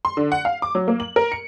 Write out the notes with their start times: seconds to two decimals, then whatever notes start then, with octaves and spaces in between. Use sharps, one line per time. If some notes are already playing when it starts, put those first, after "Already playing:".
0.05 C6
0.17 D3
0.32 F#5
0.45 F5
0.62 D6
0.75 F#3
0.88 A#3
1.00 F#7
1.16 A#4
1.32 C#7